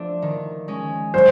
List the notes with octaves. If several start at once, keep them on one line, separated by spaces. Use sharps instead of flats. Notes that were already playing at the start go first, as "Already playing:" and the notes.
Already playing: F3 A3 D4
D#3
G#3 C#4
F#3 C5